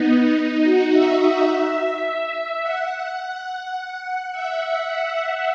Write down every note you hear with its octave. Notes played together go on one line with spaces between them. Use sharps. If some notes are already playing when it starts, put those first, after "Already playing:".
Already playing: B3 D#4
D#4
F#4
E5
F#5
F#5
E5